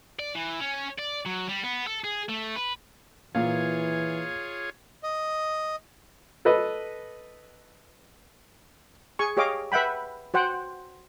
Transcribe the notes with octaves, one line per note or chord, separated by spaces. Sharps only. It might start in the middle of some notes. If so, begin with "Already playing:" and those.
D5
E3
C#4
D5
F#3
G3
B3
A4
G#4
A3
B4
A#2 E3 F4 G#4 C#5 F5
D#5
A4 B4 D#5
G#4 G#5 C#6
G4 G#4 C#5 D#5 F5 D6
B4 E5 F#5 G5 B5
F#4 C5 F#5 G5